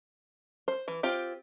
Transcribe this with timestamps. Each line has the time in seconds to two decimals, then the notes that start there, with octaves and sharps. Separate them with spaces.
0.68 C5
0.88 E3
1.03 C4 F4 G4